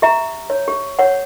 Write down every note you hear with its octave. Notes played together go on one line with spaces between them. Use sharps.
G4 E5 A#5
C#5
G4
C#5 F#5